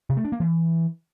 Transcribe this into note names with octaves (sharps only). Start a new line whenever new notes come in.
C3
A3
D4
A#3
E3